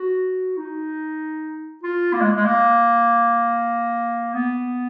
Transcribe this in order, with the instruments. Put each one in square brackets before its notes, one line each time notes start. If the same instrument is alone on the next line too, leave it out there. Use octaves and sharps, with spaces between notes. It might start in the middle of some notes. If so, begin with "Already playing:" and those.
Already playing: [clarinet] F#4
D#4
F4
A#3
G#3
G#3
A#3
B3